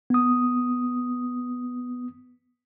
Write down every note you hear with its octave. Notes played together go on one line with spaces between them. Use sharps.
B3 D#6